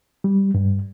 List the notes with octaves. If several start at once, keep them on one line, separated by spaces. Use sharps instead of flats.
G3
G2